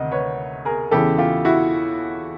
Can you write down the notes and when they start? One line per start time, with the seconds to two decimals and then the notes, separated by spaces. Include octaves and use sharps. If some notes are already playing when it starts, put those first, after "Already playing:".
Already playing: D2 C3 D#3 D#5
0.12 B4 C#5
0.65 G#4 A#4
0.91 E2 C#3 E3 G4 A4
1.18 F4 G4
1.45 E4 F#4